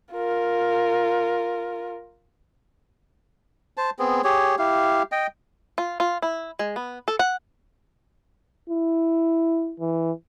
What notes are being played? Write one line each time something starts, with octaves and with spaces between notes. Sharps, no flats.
F4 A#4
C5 A5
B3 C4 G#4
G4 G#4 C#5
E4 G4 F5
D#5 G5
F4
F4
E4
G#3
B3
A4
F#5
E4
E3